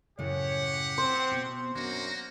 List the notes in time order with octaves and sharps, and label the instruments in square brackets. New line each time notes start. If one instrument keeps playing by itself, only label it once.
[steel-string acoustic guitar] F#2 A2 C#3 [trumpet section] G4 F#5 [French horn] C#5
[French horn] C4 [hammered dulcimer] C5
[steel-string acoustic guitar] B2
[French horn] F#2 [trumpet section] A#3 F#4 [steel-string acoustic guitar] D4